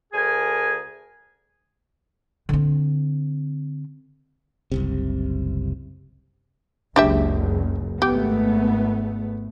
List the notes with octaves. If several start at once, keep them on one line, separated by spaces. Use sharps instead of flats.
D2 G#4 A#4 G#5
D3 C4
F#1 C2 C3
F#1 C#2 D4 G4 E5
G#1 A3 B3 G4